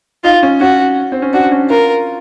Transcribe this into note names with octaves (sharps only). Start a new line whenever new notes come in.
D#4 F4
C#4
C#4 F#4
C4
C#4
D4 F#4
C#4
F4 A#4